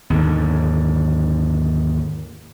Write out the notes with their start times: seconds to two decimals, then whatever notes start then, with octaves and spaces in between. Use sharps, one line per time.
0.10 D#2 G#2 D3